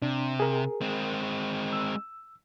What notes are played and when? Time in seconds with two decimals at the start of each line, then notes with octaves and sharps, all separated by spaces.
0.02 C3 D4
0.40 G#4 A#4
0.81 G#3 C4
1.73 E6